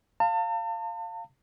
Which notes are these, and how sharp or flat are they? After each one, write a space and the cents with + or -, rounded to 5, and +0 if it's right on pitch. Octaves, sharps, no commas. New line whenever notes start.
F5 -5 A5 +40